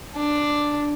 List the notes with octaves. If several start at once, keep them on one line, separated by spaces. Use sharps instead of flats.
D4